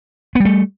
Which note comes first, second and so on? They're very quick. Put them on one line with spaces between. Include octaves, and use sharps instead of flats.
B3 G3 A3